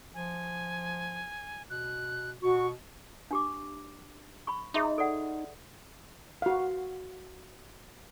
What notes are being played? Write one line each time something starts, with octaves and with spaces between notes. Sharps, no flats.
F3 G#5
B2 F#6
B2 F#4 C#6
D4 G4 D6
B5 C#6
D#4 G#4 E5 C6
A4 D5 F#5
F#4 F5